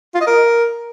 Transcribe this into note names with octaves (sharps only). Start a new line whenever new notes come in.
F4
D#5
A#4